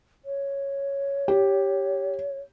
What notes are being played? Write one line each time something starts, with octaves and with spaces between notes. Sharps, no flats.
C#5
G4